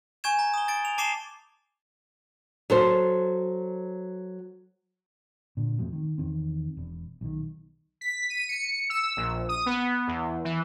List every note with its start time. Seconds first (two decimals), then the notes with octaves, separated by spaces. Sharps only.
0.24 G#5 C#6 G6 G#6 E7
0.39 A#5
0.54 D#6 G7
0.68 A6 D7
0.85 F7
0.98 A5 D6 C7 E7 G7
2.70 F#3 A4 C5
5.57 A#2 D3
5.78 D1 F2 B2 A3
5.93 D#3
6.18 E2 D#3 C4
6.77 E1
7.21 B1 D#3
8.01 B6
8.30 D#7
8.49 C#7
8.90 E6
9.17 A#1
9.49 D#6
9.66 B3
10.08 E2
10.44 E3